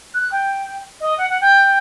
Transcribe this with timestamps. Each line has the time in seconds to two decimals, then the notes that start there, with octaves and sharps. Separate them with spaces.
0.14 F#6
0.31 G5
1.00 D#5
1.18 F#5
1.29 F#5
1.41 G5